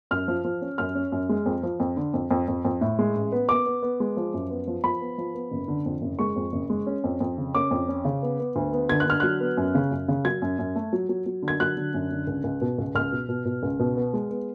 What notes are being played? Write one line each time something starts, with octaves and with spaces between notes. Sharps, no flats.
F#2 F6
F3
F3
C#4
F#2 F6
C#4
F#2
G#3
F2
F3
F2
D3
F2
F2
F2
F2
A2
G#3
A1
B3
B3 D6
B3
B3
G#3
F3
F#2
B3
F3
F3 B5
B3
F3
B3
F#1
D3
F2
F#1
G#3 C#6
F2
F#1
G#3
C#4
F2
F2
C#3
C#4 D6
F2
C#4
C#3
B3
B3
D2
B3
D3 G#6
F#6
D3 F6
F#3 F#6
B3
F#2
C#3
F#2
C#3
F#3 G#6
F#2
F#2
A3
F#3
F#3
F#3
D3
G#6
F#3 F#6
D3
F#2
D3
C#2
C#2
B2
C#2
C#2 F6
B2
B2
B2
C#2
B2
B3
G#3
B3